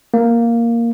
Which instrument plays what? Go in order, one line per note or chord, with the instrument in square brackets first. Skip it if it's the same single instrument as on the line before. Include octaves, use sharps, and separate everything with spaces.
[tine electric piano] A#3